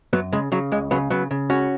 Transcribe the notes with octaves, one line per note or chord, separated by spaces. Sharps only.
F#2 F#3 B3
C#3 G#3
C#3 F#3
C#2 G#3
C#3 F#3 B3
C#3 F#3 B3
C#3
C#2 C#4 F#4